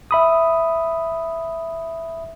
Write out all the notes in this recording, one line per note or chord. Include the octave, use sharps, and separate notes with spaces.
E5 B5 D#6